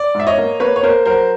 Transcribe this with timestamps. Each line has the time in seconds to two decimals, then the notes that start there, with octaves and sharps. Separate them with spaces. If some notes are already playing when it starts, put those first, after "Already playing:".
Already playing: D5
0.15 G#2 E5
0.27 C#5 D#5
0.38 A#3
0.60 A#3 B4 C#5
0.76 C#5
0.83 A#3 A#4 C5
1.05 F#3 A#4 C5